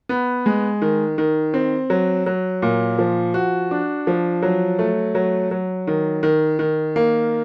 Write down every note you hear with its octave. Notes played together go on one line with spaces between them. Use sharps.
B3
G#3
D#3
D#3
C4
F#3
F#3
A#2
F3
F#4
D4
F3
F#3
A3
F#3
F#3
D#3
D#3
D#3
A#3